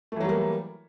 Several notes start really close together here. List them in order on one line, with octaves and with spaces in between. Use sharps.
A3 E3 F#3 G3 A#3